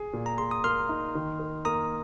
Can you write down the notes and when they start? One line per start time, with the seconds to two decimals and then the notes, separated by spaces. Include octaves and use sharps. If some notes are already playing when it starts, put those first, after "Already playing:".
Already playing: G#4
0.13 A#2
0.26 A#5
0.38 G#4 C6
0.51 D#6
0.64 A#3 C6 F6
0.89 D#4
1.15 D#3
1.39 A#4
1.65 A#3 A#5 D#6